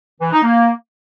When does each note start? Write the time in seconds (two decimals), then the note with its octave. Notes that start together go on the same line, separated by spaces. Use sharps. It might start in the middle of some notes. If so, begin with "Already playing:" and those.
0.21 E3
0.32 D#4
0.43 A#3